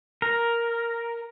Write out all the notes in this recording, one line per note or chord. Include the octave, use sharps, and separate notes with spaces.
A#4